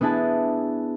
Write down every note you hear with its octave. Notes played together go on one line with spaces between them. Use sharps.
B3 D4 E4 G#4 A5